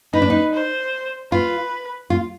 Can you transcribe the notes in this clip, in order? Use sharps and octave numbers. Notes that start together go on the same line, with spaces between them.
D#4 B4
D4
D#4
C5
F4 B4
F4